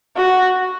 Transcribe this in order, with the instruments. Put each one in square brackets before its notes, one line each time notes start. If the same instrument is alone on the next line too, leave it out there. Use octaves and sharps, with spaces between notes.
[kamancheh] F#4